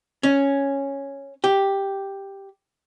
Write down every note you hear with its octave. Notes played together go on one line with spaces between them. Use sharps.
C#4
G4